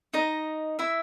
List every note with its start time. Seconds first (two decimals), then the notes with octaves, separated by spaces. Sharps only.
0.13 D#4 D#5
0.79 E4 E5